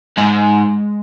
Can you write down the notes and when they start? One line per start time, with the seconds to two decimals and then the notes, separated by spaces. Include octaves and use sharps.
0.17 G#2 G#3